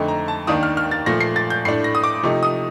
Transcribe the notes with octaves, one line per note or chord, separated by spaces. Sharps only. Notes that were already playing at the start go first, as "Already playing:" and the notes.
Already playing: F2 D3 A3 D#4
A#5
A5
D#2 D#3 A#3 D4 D#6
F6
F6
A6
A#2 F3 A3 A#6
C7
A6
G6
A2 A3 D4 C7
A#6
D#6
D6
C3 F3 A3 D#4
D#6